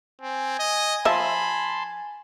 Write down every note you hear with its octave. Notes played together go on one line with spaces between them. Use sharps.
C4 G#5
D#5
F3 E5 A5 B5 C6